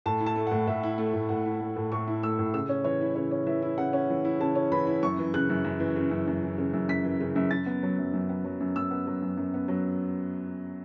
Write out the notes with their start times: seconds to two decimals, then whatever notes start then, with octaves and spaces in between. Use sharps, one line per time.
0.06 A2 A5
0.20 E4
0.26 A5
0.36 A3
0.47 A2 F#5
0.67 A2 E5
0.83 E4
0.98 A3
1.13 A2
1.29 A2 F#5
1.46 E4
1.61 A3
1.76 A2
1.92 A2 C#6
2.07 E4
2.23 A3 E6
2.39 A2
2.54 C#3 E6
2.69 C#4
2.84 E3 C#5
3.01 E4
3.15 C#3 C#5
3.31 C#4
3.47 E3 E5
3.62 E4
3.78 C#3 F#5
3.93 C#4
4.10 E3
4.25 E4
4.40 C#3 A5
4.55 C#4
4.72 E3 B5
4.87 E4
5.03 F#2 C#6
5.19 E3
5.34 C#3 F#6
5.50 F#2
5.64 F#2
5.80 E3
5.96 C#3
6.11 F#2
6.27 F#2
6.43 E3
6.58 C#3
6.73 F#2
6.88 F#2 B6
7.04 E3
7.20 C#3
7.36 F#2
7.51 F#2 A6
7.66 B3
7.83 F#3
7.98 F#2
8.13 F#2
8.29 B3
8.44 F#3
8.60 F#2
8.76 F#2 E6
8.91 B3
9.07 F#3
9.22 F#2
9.37 F#2
9.54 B3
9.68 F#3